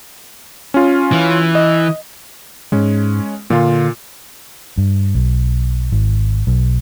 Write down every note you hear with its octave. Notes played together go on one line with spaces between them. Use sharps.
C#4 F4
E3
D#5
G#2 G#3 C#4
A#2 D3 F4
G2
B1
G#1
B1